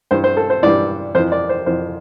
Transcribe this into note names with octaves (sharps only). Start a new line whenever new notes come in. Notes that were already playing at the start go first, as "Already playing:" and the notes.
G2 E3 C5
C5
A4
C5
G2 E3 D5
F2 E3 C5
D5
C5
F2 E3 C5